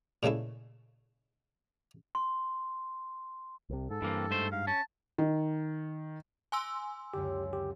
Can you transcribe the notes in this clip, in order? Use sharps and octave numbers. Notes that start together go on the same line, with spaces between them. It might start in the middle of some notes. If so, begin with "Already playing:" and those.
A#2 C#3 G#3 A3 E4
C6
C2 C3
G#2 A4
G2 E3 A#3 C4
G#2 A3 C5
G#2 F5
C#4 A5
D#3
G#5 C6 D6 E6
C#2 F#2 D3 G4
G4